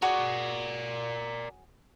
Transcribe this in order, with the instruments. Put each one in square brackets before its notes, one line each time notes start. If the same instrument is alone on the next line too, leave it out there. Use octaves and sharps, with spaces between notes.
[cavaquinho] F#4 G#4 C#5 [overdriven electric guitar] A#4 D5